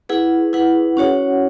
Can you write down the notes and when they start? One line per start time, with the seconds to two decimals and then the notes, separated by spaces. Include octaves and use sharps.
0.09 E4 G#4 B4 F#5
0.53 E4 G#4 B4 F#5
0.97 C#4 F#4 C#5 F#5